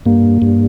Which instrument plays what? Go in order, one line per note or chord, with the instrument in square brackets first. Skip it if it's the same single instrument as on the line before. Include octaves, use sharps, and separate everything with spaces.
[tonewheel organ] G2 [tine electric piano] A#3
[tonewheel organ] G2